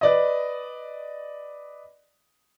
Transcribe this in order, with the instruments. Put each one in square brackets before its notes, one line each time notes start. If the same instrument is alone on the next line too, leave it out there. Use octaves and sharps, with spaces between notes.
[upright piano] B4 D5 D#5